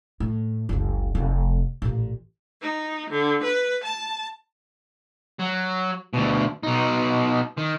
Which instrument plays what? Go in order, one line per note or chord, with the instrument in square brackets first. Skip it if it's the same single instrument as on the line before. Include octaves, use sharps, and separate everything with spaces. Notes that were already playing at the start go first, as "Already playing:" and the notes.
[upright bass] A2
F#1 C#2
F1 F2
A1 A#2
[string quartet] D#4
D3
B4
A5
[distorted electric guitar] F#3
D2 B2
B2 D#4
D#3